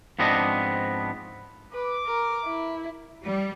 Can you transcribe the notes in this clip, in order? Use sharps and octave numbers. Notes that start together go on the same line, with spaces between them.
G#2 F3 B3 C4 D4 D#5
B4 D6
A#4
E4
G3